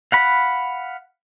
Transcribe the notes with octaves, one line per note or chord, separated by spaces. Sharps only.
F5 F#5 B5